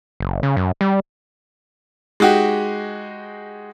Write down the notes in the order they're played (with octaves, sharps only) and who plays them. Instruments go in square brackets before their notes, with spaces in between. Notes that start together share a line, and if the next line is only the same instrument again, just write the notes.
[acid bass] F#1
C#3
F#2
G3
[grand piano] G#3 D#4 F#4 G4